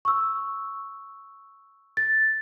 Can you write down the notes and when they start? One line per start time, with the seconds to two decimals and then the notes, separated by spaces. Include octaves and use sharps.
0.05 C#6 E6
1.97 A6